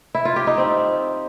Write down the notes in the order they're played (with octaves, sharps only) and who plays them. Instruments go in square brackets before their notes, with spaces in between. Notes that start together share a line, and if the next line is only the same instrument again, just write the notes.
[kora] E4
F4
G4
D#4
C4